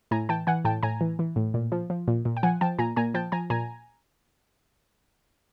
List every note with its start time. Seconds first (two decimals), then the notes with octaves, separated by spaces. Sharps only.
0.11 A2 G#5 A#5
0.29 E3 G5 A5
0.47 E3 F#5 G#5
0.65 A2 G5 A5
0.83 A2 G#5 A#5
1.01 E3
1.19 E3
1.36 A2
1.54 A#2
1.72 F3
1.90 F3
2.08 A#2
2.25 A#2
2.37 G5
2.43 F3 F#5 G#5
2.61 F3 G5 A5
2.79 A#2 G#5 A#5
2.96 A#2 G#5 A#5
3.14 F3 G5 A5
3.32 F3 G#5 A#5
3.50 A#2 G#5 A#5